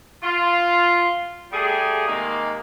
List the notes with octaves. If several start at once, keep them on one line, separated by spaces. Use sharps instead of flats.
F4
G3 A3 G4 G#4
C3 D#3 G#3 A#3